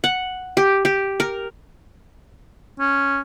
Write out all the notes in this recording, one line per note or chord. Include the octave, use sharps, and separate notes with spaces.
F#5
G4
G4
A#4
C#4